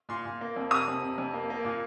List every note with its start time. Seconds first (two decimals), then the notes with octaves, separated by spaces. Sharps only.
0.09 A#2 C6
0.26 A#2
0.41 A#3
0.56 F2
0.71 C3 D#6
0.88 F2
1.02 C3
1.18 F2
1.34 A#3
1.50 A#3
1.65 A#2